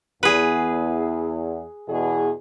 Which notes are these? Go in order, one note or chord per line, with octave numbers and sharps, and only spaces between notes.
E2 G#4 B4
E2 B2 G#4